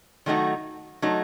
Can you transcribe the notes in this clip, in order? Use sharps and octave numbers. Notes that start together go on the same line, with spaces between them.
D#3 F#3 A3 D#4 F#4
F#3 A3 D#4